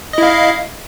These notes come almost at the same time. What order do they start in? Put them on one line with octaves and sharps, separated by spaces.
D#5 E4 F5